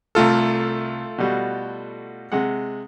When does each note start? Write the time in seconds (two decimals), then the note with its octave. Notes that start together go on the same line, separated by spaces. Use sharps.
0.15 C2 A3 F4 A4 A#5 F6
1.18 B2 G3 F#4
2.32 C3 G#3 F#5